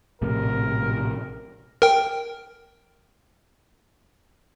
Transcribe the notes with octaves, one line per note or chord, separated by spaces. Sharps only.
A#1 A2 C3 A#4
A#4 G5